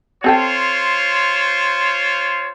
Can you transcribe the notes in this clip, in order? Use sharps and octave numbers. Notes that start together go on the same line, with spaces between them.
C4 F4 A4 C5 C#5 G5